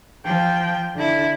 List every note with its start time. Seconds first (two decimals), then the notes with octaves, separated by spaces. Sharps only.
0.25 F3 G5
0.96 D3 E4